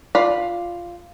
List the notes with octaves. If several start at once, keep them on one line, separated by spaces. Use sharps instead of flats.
F4 D5 B5